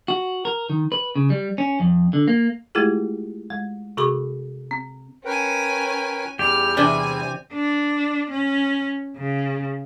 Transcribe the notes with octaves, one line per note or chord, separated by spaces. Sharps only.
F#4
A#4
D#3
B4
C#3
G3
C#4
F2
D3
A#3
G#3 A3 E4 F4 G4 G#4
G#3
C3 F#4 G#4 B5 C#6 D6
C4
C#4 A#4 B4 G5 G#5
E2 G3 G4 F6
C3 E3 C4 D4 G#5
D4
C#4
C#3